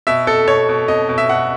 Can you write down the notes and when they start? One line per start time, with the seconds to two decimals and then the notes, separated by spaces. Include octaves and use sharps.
0.07 B2 E5
0.27 B2 A4
0.47 B2 C#5
0.69 B2
0.88 B2 D#5
1.09 B2
1.18 E5
1.29 B2 F#5